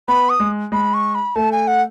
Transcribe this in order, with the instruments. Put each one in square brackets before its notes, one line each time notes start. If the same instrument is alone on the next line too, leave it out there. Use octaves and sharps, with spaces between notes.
[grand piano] B3 [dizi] B5
[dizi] D#6
[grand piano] G#3
[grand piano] G#3 [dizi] B5
[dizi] C#6
B5
[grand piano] A3 [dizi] A5
[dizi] G#5
F#5